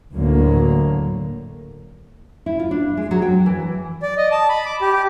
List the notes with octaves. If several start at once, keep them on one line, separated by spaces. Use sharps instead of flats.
D2 A2 D3 F#3 A#3
E4
F4
D4
G#3
F#3
G5
E3
D5
D#5
A5
B5
D6
G4
G4